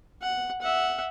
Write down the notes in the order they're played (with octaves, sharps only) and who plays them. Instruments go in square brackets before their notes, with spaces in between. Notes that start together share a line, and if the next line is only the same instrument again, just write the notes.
[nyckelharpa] F#5
E5 F#5